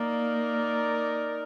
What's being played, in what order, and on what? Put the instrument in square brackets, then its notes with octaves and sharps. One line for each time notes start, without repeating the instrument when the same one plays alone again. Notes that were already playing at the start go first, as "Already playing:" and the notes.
Already playing: [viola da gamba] A#3 [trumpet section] D#4 A#4 D5